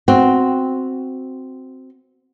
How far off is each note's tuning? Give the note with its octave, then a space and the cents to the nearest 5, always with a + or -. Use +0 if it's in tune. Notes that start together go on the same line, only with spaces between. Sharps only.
C4 -5 F#4 +0